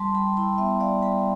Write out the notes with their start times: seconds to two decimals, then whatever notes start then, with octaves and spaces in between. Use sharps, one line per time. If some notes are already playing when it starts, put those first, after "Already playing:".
Already playing: G3 A5 C6
0.14 G3 G5 B5
0.36 E4 G5 B5
0.58 B3 E5 G5
0.80 G3 D5 F5
1.02 G3 G5 B5